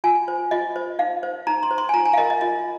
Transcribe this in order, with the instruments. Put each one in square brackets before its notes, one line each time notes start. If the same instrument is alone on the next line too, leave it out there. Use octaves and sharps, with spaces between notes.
[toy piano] F4 G#5
C5
F4 D#5
C5
D#4 F5
C5
D#4 A#5
C6
C5
C6
G#5
F4 A#5
G#5
F5
A#4 D#5
D#5
F4 D#5